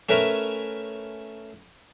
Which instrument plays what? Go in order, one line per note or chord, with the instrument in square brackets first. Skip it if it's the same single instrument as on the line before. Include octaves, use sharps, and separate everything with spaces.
[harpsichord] A3 C#4 A#4 B4 E5